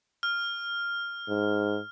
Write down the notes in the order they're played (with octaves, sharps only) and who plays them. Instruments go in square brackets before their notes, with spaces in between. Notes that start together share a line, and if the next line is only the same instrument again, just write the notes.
[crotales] F6
[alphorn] G#2